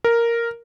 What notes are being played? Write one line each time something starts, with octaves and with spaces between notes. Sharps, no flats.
A#4